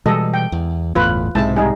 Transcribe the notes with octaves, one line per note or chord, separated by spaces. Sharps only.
B2 E3 G3 G#3 A4 D#5
G5
E2
G1 E2 A2 F4 B4
B1 G#2 C3 G#3 E4 A5
G3 D#4 G#4